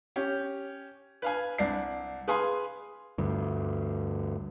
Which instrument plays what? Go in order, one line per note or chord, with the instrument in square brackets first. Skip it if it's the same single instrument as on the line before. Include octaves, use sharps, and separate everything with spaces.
[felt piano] C#4 G4
B4 F5 G#5
C2 D4 C7
G#4 B4 F5 G#5 C6
[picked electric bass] D2 G2